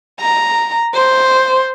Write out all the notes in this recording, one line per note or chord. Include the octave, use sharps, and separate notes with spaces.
A#5
C5